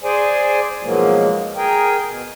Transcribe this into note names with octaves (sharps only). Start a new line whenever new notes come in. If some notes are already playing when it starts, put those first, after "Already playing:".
G#4 C5 D5 G#5
G#2 B2 F3 F#3 G#3 A#3
G#4 A#4 G5
B2